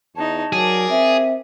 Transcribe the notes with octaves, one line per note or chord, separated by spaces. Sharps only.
E2 D#4 C#5 A5
F#3 G#4 A#4 D5
C4 E5